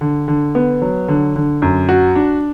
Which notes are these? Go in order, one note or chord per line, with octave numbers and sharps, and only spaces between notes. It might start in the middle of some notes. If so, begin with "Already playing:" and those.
D3
D3
B3
F#3
D3
D3
F#2
F#4
D4